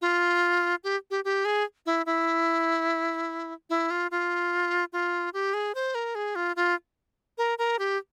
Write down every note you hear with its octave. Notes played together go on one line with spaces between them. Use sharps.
F4
G4
G4
G4
G#4
E4
E4
E4
F4
F4
F4
G4
G#4
C5
A#4
G#4
F4
F4
A#4
A#4
G4